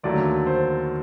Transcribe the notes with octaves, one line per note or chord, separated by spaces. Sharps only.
D#2 D3 F#3 A3 D5
C5